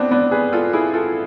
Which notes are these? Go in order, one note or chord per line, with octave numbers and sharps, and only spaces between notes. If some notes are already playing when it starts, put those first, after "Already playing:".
Already playing: B3 C4 D4
B3 D4
G#4 B4
F4 A4
E4 G#4
F4 A4